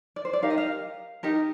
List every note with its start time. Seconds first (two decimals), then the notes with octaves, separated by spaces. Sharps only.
0.16 D5
0.25 C5
0.33 D5
0.42 D#4 G4 A#4 F5
0.50 D#5
0.58 F5
1.23 D#4 G4 A#4